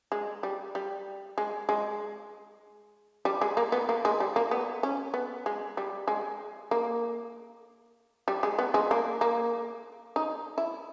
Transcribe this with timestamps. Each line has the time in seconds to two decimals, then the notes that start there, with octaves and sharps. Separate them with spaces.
0.12 G#3
0.43 G3
0.75 G3
1.38 G#3
1.69 G#3
3.25 G3
3.41 G#3
3.57 A#3
3.72 B3
3.89 A#3
4.05 G#3
4.20 G3
4.36 A#3
4.51 B3
4.83 C#4
5.14 B3
5.46 G#3
5.77 G3
6.08 G#3
6.71 A#3
8.28 G3
8.43 G#3
8.59 B3
8.74 G#3
8.91 A#3
9.21 A#3
10.16 D#4
10.58 E4